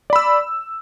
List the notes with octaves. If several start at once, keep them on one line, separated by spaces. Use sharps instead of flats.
D5 B5 E6